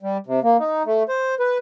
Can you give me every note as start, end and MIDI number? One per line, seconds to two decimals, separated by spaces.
0.03 0.17 55
0.27 0.40 48
0.43 0.57 58
0.60 0.83 63
0.86 1.03 57
1.09 1.35 72
1.40 1.58 71